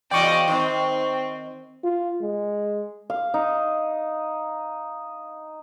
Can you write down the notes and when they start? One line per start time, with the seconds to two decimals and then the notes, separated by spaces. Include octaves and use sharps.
0.11 E2 C#3 F#4 D5 D#5 G5 C#6
0.47 D#3 C4 C5
1.83 F4
2.22 G#3
3.10 F5
3.34 D#4